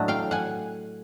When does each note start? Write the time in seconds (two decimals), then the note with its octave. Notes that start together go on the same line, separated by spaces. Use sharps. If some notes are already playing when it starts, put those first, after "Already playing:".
Already playing: A2 F#3 A3 D4 D#5
0.08 F5 G5
0.31 F#5 G#5